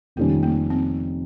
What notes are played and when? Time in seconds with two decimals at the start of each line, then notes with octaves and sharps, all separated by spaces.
0.16 F1 F2 D#3 G3 A#3 C#4
0.43 A#3
0.70 C4